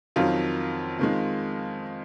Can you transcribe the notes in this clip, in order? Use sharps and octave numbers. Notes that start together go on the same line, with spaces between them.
F2 D#3 F#3 F4
F2 D#3 G#3